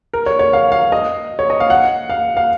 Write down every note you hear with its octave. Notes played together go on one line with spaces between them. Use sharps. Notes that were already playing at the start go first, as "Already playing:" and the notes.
A#4
C#5
C#5
F5
F5
D#5
C#5
D#5
F5
F#5
F5
F5